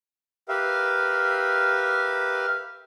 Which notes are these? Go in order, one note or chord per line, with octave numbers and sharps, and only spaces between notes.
G4 A#4 B4 E5 F5